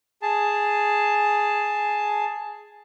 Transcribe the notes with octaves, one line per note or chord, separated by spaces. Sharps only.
G#4 A5